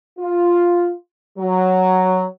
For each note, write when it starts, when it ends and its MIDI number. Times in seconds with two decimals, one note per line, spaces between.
0.19 0.92 65
1.39 2.24 54